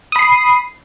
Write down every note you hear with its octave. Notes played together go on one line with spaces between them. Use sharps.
B5 D#6 C7